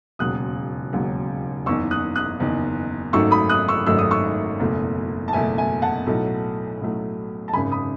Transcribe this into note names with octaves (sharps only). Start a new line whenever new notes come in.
E1 D#2 C#3 F#3 D#6 F#6
E1 D#2 C#3 F#3
F#1 E2 D#3 C#6 E6
D#6 F#6
D#6 F#6
F#1 E2 D#3
G#1 F#2 D#3 F#3 A3 C#6 E6
B5 D#6
D#6 F#6
C#6 E6
G#1 F#2 D#3 F#3 A3 E6
D#6
C#6 E6
F#1 E2 B2 A3
A5
F#1 E2 B2 A3 E5 G#5
E5 G#5
F#5 A5
B1 A2 F#3 A3
B1 A2 F#3 A3
A5
G#1 F#2 C#3 G#5 B5
B5 D#6